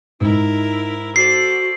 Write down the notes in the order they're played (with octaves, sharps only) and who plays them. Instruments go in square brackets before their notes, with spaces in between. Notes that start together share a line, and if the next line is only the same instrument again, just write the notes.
[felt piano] G#2 [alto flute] D#4 [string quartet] E4 A#4
[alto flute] F#4 [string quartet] A4 C5 D5 [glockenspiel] C7